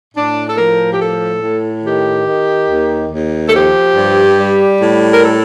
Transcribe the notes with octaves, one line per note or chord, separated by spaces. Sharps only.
A2 D4
A4
F3 A#4
G4
A2 A4
A2
D#3 G4
D#3
D#2
D#2
A4
F3 G4
G2
G3
A2
A#4
A4